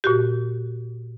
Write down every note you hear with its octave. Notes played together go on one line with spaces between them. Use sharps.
A#2 F#4 G4